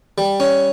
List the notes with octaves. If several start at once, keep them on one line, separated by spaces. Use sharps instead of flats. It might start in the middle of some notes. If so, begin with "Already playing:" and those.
G3
C#4